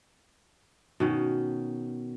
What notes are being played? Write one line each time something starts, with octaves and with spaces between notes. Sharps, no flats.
B2 D#3 C#4